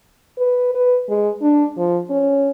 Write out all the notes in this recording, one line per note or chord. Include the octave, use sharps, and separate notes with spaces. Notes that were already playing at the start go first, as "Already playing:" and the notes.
B4
B4
G#3
D4
F3
C#4